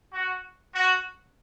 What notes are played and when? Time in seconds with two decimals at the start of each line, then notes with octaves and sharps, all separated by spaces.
0.13 F#4
0.74 F#4